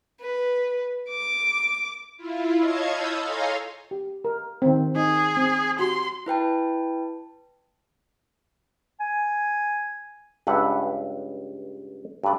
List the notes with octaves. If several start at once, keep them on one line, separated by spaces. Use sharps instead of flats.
B4
D6
E4 F4
C#5 D#5 F5 A5 G#6
B5 D#6 E6 G6
A4 C#5 F5 G#5 A#5 C6
G4
A#4
D#3 C4
D#4 G#4
C4
F#4 G4 C6
E4 B4 G5 A5
G#5
C#2 G2 B4 E5 F#5
G2 A3 B4 D5